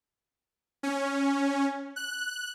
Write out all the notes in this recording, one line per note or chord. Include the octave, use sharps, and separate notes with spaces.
C#4
F#6